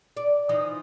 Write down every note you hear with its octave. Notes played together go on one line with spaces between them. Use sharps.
D5
E3 F3 D#4